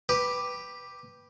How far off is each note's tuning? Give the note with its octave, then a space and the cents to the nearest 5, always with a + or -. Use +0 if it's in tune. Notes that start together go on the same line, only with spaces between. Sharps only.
G4 +0 B4 +0